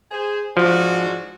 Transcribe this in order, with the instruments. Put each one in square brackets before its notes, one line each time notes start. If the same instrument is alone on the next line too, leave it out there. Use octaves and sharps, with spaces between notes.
[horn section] G#4 C5
[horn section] G#2 D4 F#4 [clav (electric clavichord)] F3